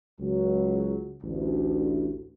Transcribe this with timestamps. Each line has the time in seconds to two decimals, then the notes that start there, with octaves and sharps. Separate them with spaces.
0.19 C#2 F#3
1.22 A1 D2